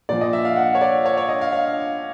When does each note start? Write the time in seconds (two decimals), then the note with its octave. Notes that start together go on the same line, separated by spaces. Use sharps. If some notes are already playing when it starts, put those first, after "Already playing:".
0.09 A#2 F3 D5
0.21 D#5
0.33 E5
0.45 F5
0.56 F#5
0.75 C#5
0.81 D5
1.06 C#5
1.17 C#5
1.29 D#5
1.41 F5
1.53 F5